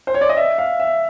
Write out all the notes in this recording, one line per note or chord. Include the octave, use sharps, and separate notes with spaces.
C5
C#5
D5
D#5
E5
F5
E5